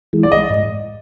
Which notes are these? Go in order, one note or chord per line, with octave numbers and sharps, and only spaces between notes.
E3 G#3
D5
D#5
G#2